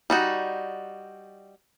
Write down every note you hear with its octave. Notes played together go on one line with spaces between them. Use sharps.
G3 D#4 F#4